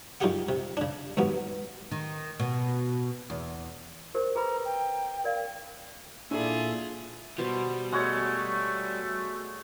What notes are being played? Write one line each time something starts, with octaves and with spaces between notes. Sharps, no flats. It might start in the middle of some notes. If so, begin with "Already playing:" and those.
F#2 D#4 F4 G4 G#4 F#5
C3
C#3 D4
D#2 G#2 F#3 A#3 B3
D#3
B2
E2
G4 A#4 C5
G#4 B4 A#5 B5
G5
A#4 D5 F5
A#2 D4 E4 F4 G#4 A4 E5
B2 G3 B3 C5
G#3 A3 F#4 C#5 F#5